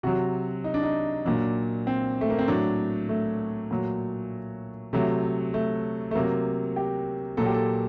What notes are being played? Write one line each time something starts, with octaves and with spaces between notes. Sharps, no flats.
C3 F#3 F#4
D#4
D4
D#4
A#2 F#3 D4
C4
A3
A#3
C4
A2 F#3 D4
A3
A#2 F#3
C3 F#3 A3
A3
A3
C3 F#3 A#3
G4
A#2 F#3 A4
G4
A4